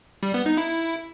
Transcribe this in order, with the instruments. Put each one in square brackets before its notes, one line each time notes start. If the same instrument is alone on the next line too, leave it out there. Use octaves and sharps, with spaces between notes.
[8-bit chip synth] G3
B3
D#4
E4